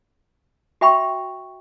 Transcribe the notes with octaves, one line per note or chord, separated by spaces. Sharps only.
F#4 E5 G5 B5 C#6